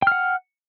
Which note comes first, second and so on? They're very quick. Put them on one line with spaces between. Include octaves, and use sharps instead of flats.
G5 F6 F#5